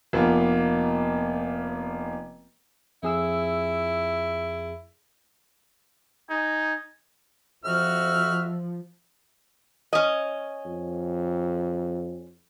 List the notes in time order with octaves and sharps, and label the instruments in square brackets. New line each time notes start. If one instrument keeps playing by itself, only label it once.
[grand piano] F1 A#3 B3 F4
[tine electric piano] F2 G#4 E6 [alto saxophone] E4
[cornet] D#4 [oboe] G#5
[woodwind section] F2 E5 [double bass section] F3 [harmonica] F#4 F6
[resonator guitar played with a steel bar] C#4 D#5
[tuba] F2